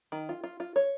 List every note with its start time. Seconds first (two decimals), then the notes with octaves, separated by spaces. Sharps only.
0.12 D#3
0.29 F4
0.44 F4
0.60 F4
0.76 C#5